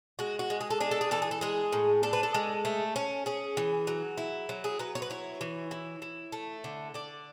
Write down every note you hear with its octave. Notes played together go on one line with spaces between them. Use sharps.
G#3 F#4
F#4
G#3
G#4
A4
D4 G#4
A4
G#4
E3 A4
G#4
A4
G#3 G#4
A2
D4 A4
B4
A4
G#3
A3
C#4
C#4 G#4
E3
F#3
E4
F#3
G#4
F#3 B4
C#5
B4
E4 C#5
E3
E4
E4
A3
D3
D3 D5